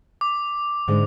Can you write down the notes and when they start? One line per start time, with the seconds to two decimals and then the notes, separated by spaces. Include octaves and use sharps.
0.21 D6
0.88 G#2 D3 G#3